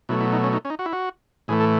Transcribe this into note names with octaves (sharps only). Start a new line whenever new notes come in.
B2 F#3 A3 E4
E4
D#4
C#4
D#4
C#4
D#4
F#4
E4
F#4
A2 E3 A3 G#4
A4